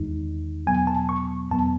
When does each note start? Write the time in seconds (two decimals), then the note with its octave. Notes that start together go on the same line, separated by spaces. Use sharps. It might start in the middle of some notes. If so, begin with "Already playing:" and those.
Already playing: E2 D#3 G#3 D#4
0.67 E2 B2 F#3 B3 G#5
0.87 A5
1.09 C#6
1.51 E2 B2 F#3 B3 A5